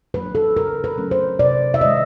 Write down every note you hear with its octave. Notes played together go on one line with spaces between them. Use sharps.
F#3 A#3 D4 B4
A4
C#3 A#4
B4
F#3 A3 C#4
C5
C3 D5
E5
D#3 G#3 D#5